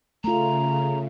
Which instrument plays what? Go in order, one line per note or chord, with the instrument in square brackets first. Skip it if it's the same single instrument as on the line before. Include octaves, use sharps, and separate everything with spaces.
[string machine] C#3 [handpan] A3 F4 [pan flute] A#5